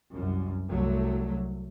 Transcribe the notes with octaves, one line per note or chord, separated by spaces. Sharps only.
C2 F#2
C2 F#3 A3